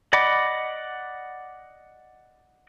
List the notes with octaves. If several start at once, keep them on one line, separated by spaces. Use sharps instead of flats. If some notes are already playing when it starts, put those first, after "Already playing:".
D5 D#5 F#5 B5 D6